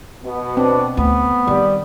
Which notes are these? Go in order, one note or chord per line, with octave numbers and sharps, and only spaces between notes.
B2 B3
C4 D4
D2 B3
D#3 G3